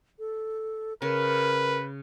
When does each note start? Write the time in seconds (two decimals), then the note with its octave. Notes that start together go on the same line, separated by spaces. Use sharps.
0.19 A4
1.02 C#3 A#4 B4